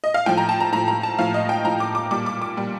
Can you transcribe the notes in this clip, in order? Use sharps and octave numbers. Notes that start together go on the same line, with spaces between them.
D#5
F5
A2 F3 G5
A#5
A5
A#5
A2 F3 A#5
A#5
A5
A2 F3 F5
D#5
G5
A2 F3 A#5
D6
D6
A#2 G3 D6
D6
D6
A#2 G3